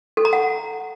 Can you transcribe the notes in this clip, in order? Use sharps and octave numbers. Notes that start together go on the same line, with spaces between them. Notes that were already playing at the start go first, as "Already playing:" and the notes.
A4
A#5
F#5